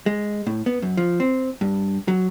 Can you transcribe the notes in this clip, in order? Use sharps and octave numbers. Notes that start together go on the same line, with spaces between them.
G#3
A2
B3
F#2
F3
C4
G2
F#3